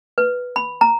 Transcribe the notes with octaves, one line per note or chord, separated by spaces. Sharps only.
B4
B5
A#5